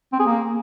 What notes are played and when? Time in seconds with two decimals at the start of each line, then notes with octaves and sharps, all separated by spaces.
0.13 C4
0.19 G#4
0.26 A#3